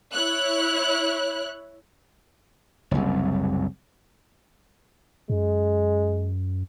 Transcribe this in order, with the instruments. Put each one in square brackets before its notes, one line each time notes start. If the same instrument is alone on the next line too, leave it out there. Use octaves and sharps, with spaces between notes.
[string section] E4 C#5 F#6
[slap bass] F#1 C2
[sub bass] F#2 [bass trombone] G#3